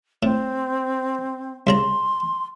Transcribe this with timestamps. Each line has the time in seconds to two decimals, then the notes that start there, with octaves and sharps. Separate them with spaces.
0.23 A2 C4
1.67 C2 C#3 A#5 C6